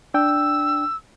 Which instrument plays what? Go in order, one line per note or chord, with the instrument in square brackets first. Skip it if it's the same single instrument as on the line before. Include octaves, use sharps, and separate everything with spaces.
[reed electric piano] D4 G5 [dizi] E6